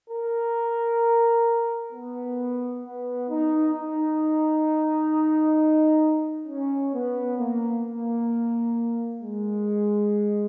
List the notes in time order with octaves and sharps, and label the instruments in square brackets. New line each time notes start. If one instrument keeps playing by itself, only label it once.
[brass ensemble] A#4
B3
B3
D#4
D#4
C#4
B3
A#3
A#3
G#3